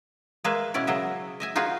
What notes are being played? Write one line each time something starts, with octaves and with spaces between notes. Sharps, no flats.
G#3 A#3 G#4 B4 E5
B2 C#4 E4 D5
C#3 F#3 D#5 E5
D#5 E5 G#5
D#4 F4 F#4 G#4 B4